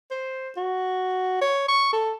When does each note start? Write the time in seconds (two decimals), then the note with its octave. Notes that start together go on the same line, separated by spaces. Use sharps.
0.11 C5
0.57 F#4
1.42 C#5
1.68 C#6
1.93 A4